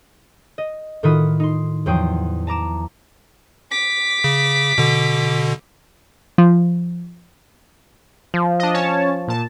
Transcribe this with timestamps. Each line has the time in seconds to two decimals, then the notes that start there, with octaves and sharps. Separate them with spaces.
0.58 D#5
1.03 A2 D#3 F4 F#4 B5 D#6
1.40 D#4 C6
1.86 E2 F3 F#3 G5 C6 D#6
2.47 A5 A#5 D6 E7
3.71 D6 B6
4.24 C#3
4.78 B2 D3
6.38 F3
8.34 F3
8.60 D4 D#5
8.74 C#4 C#5 A5
9.28 A#2 A5